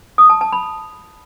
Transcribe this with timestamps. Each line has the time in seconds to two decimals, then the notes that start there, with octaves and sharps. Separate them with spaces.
0.18 D#6
0.30 A5
0.41 A5
0.52 B5